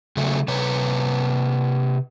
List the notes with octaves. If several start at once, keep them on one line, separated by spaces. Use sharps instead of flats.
C#3 F#3 A3
C3 B4 C#5